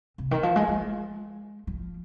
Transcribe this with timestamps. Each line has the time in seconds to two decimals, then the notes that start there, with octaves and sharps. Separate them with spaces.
0.18 C3
0.31 D#3
0.43 F3
0.56 G#3
0.68 G#3
1.67 F3